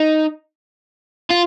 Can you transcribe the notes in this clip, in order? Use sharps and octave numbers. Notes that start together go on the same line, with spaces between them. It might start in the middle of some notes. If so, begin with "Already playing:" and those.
Already playing: D#4
F4